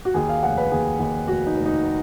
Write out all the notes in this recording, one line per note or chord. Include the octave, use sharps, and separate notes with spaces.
F#4
D#2 G#4
F5
F1 F#5
B4
D#2 G#4
D#2
F1 F#4
D#4
F1
D#4